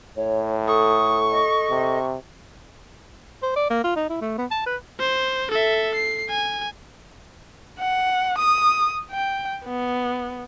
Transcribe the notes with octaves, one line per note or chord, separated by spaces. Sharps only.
A2 C#5
A4 C#6 D#6
D#5
C3
C5
D5
A#3
F4
D#4
E4
A3
B3
A5
B4
C5
A4 E5
C7
G#5
F#5
D#6
G5
B3